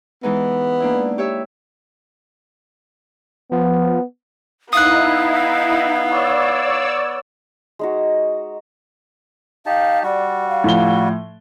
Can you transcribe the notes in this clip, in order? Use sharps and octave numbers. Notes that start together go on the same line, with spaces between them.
E3 G#3 B3 D#4
A#3 D4 E4
G4 C#5 E5
F3 B3
B3 D#4 E4 F5 D#6 F#6
C#5 D5 E6
G#3 D#4 F#4
D#4 G4 F5 A5
G3 F#4 D5
F5
A2 F3 G7